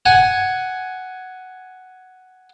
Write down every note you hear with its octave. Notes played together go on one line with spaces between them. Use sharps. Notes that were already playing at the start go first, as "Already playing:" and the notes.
F#5 G#5